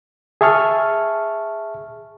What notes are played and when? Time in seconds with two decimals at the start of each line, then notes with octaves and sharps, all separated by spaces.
0.41 G#4 E5 A5 C#6 F6